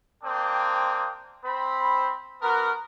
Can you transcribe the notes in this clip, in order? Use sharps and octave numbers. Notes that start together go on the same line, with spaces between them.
A#3 C4 D4 G5 D#6
C4 C5 B5
B3 F#4 A#4